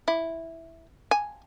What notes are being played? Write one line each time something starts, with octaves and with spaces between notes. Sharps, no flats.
E4
G#5